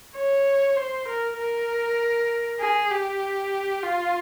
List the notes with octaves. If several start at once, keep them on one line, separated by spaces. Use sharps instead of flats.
C#5
C5
A#4
A#4
G#4
G4
F4